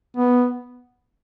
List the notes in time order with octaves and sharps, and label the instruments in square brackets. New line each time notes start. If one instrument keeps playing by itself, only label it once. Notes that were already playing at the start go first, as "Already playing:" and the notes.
[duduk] B3